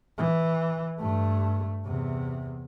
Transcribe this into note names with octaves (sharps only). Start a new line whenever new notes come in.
E3
G2 A3
E2 C3